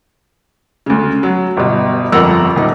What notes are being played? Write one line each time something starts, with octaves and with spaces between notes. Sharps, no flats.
D2 C#3
F#3
G1 B2
G1 F2 A#4 F#5 A#5 E6
D#1 D#4